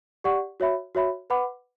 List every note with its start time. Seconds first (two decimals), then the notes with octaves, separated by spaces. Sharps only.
0.24 G4 D5 F#5 C#6
0.60 F#4 C#5 E5 B5
0.95 F#4 C#5 E5 B5
1.30 B4 F#5 B5 D6